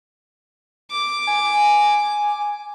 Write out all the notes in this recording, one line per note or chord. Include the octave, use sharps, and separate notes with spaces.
D6
G#5